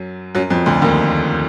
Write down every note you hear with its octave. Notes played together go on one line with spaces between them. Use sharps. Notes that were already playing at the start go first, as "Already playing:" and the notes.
Already playing: F#2 F#3
F#2 F#3
F2 F3
D2 D3
D#2 D#3